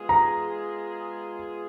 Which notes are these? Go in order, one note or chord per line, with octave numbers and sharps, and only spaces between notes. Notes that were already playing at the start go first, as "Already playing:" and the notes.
Already playing: G#3 B3 F4 G#4
A#5